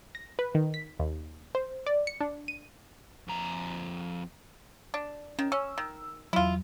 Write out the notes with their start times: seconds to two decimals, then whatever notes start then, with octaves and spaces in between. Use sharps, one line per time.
0.15 A#6
0.39 B4
0.55 D#3
0.74 B6
1.00 D#2
1.55 C5
1.86 D5
2.07 C#7
2.21 D4
2.48 D#7
3.28 F2 A#5
4.94 D4
5.39 D#3 C#4
5.52 C#4 E6
5.78 D#3
6.33 E2 F#3 E4 F4